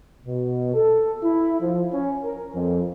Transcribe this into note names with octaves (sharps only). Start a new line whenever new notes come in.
B2
A4
E4
F3
C#4
A#4
F2